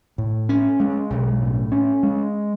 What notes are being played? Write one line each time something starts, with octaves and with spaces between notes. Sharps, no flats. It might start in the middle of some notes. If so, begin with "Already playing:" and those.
A2
C#4
G#3
B1
A2
C#4
G#3